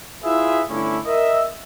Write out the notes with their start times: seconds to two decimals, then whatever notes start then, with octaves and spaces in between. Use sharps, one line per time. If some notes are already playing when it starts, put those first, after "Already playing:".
0.24 E4 F4 G#4 B4 E5
0.70 G1 A3 C#4 D4 E4
1.05 A#4 D#5 E5